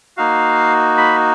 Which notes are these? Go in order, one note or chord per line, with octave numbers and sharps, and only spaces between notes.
A#3 D#4 F#4 F5
B5